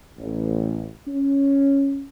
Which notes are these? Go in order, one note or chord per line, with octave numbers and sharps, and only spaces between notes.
A1
C#4